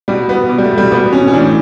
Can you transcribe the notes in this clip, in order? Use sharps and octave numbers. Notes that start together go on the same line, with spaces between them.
B2 G3
B3
B2
G3
A3
G3
B2 B3
C#4
C#4
A2 E3 D4